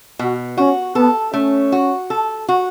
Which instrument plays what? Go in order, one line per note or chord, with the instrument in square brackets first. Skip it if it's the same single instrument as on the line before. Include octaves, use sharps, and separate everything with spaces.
[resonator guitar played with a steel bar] B2 [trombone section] F#4
[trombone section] C#4 [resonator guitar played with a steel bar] F#4
[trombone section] B3 [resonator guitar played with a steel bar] A4
[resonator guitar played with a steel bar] A3 [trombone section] C#4
[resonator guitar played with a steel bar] F#4
A4
F#4